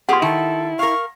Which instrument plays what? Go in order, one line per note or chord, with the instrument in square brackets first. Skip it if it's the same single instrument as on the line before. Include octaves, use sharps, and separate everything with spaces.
[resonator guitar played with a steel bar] B3 G4 G#4 [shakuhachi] F4 [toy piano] F#5 C6
[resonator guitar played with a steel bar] D#3 [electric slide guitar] E4 [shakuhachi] A4
[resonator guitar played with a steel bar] A#4 F5 [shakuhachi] C#6